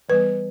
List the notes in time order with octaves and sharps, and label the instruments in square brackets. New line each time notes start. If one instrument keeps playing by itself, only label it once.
[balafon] E3 G3 B3 B4